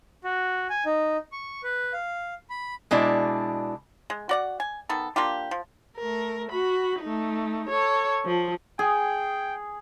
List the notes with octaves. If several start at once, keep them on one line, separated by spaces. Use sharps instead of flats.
F#4
G#5
D#4
C#6
B4
F5
B5
B2 G#3 D4 E4 D5
G#3
F#4 D5 F#5
G#5
D#3 B3 A4
A#3 D4 F4 G4
F3
A3 A#4
F#4 B5
A3 D#4
A4 C#5
F3
G#4 G5